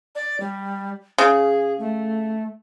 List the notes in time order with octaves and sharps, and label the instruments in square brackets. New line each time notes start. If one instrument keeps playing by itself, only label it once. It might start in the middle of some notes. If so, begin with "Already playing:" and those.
[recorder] D5
G3
[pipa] C#3 [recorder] G#4
[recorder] A3